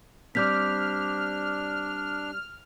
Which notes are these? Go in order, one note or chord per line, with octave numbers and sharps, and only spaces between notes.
G3 C4 D4 D6 F6 G6 B6